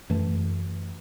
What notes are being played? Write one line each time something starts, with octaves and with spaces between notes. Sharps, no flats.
F#2 E3 A3